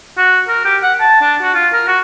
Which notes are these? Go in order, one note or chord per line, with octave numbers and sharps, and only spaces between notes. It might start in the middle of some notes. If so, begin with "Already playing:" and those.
F#4
A#4
G4
F#5
A5
D4
F#4
F4
A#4
F#4